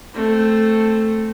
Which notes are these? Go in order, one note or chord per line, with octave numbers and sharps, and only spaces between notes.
A3 C4